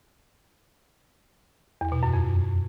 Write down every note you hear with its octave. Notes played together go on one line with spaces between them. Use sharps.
E2
B2
F#2
F2